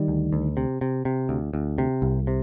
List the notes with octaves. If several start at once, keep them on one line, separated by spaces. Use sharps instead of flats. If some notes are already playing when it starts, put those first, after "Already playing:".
Already playing: D#3 G3
D2
D2
C3
C3
C3
D2
D2
C3
C2
C3